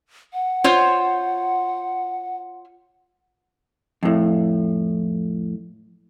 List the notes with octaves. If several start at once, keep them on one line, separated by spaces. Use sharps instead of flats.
F#5
F4 C5 C#5
F2 A2